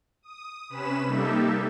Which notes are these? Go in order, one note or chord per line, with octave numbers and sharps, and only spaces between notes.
D#6
C3 C#4 B4 B5 E7
G3 A#3 D#4 G4 A4 E5